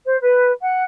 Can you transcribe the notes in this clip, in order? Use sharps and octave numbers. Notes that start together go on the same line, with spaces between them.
C5
B4
F#5